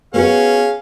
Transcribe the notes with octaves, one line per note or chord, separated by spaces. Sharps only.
B3 C#4 F#4 G#4 F5 F#5